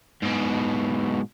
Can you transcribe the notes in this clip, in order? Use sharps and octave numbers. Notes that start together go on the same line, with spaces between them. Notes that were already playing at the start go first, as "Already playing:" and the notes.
G#2 B2